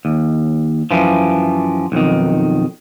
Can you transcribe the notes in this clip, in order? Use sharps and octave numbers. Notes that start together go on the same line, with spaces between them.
D#2
F#2 E3 F3
B1 F2 D#3